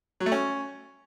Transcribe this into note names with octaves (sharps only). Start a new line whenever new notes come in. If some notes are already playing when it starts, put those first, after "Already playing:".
F#3
A3
C#4